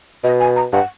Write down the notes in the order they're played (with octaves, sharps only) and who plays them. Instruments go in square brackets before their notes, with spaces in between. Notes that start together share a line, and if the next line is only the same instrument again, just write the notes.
[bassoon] B2 [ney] D#5
[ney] G#5
A#5
[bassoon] G2 [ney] F#5